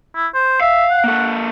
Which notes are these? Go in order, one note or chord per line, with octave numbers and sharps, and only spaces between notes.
E4
C5
E5 F5
F#5
A#3 A4